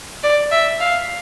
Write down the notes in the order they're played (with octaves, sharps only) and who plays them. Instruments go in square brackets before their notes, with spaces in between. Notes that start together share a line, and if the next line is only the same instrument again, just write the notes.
[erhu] D5
E5
F5